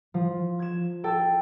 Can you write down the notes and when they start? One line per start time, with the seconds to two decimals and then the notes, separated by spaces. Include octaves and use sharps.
0.14 F3
0.59 G#6 E7
1.04 A4 G5